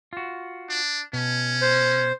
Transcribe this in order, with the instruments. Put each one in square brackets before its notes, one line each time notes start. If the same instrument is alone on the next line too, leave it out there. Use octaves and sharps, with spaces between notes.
[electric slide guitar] F4 F#4
[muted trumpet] D4
[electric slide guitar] B2 [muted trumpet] C#4
[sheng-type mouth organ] C5